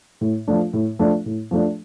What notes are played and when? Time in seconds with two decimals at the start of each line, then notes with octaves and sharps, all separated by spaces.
0.21 A2
0.48 F3 A3 D4
0.73 A2
0.99 F3 A3 D4
1.26 A2
1.51 F3 A3 D4